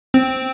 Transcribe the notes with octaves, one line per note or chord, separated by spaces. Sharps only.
C4